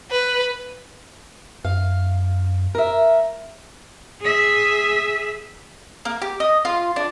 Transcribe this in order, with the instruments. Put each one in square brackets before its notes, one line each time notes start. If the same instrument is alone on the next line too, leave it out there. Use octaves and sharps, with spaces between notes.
[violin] B4
[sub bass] F#2 [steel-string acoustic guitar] F5
[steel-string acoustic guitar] A#4 E5
[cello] G#4 E5
[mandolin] A#3
G4
D#5
F4
D4